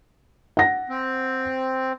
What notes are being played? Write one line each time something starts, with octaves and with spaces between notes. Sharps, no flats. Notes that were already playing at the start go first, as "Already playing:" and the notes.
F#5 A#6
C4